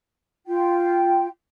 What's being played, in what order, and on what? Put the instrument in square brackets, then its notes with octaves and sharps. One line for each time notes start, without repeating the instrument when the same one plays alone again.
[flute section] F4 G5